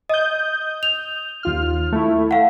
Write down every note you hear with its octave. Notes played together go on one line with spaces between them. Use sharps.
D#5 D#6 G6
F7
D#2 F4 F6
A3 E4
F5 F#5